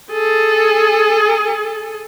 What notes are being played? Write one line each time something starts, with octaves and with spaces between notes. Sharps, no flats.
G#4 A4